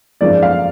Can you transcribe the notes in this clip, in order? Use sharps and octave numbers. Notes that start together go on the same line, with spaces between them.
G#1 F#2 F3 G#3 D5
F5